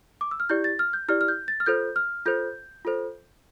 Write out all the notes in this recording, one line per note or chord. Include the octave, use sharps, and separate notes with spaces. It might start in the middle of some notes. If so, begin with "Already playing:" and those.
D6
E6
F6
E4 G4 D5 G6
A6
F6
G6
E4 G4 D5 F6
F6
G6
A6
F6
F4 A4 C5 G6
F6
F4 A4 C5 G6
F4 A4 C5